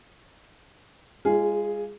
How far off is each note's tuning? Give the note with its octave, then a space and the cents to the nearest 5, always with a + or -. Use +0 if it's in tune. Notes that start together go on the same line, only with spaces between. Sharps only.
G#3 -35 F4 -20 G#4 +0